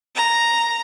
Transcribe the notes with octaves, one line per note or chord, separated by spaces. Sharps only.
A#5